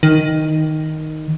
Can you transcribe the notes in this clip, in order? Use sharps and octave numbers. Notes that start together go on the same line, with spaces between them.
D#3